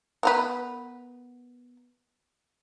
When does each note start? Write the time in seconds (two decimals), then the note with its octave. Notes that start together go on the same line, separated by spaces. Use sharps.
0.23 B3 A#4 B4